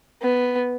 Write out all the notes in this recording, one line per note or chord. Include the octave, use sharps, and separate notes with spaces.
B3